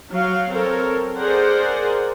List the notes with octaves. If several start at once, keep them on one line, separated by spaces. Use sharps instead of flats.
F#3 F5
C4 A4 A#4 C#5
G#4 A#4 C5 D5 F#5